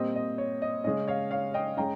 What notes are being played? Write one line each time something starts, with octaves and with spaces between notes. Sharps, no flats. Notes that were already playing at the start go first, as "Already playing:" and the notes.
Already playing: A#2 G3 C4 D#5
D#5
C#5
D#5
C#3 G#3 C#4 D#5
C#5 F5
C#5 F5
D#5 G5
G#3 C#4 G5 A#5